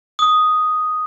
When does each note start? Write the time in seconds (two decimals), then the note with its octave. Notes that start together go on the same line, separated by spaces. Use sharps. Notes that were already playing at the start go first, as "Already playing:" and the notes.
0.19 D#6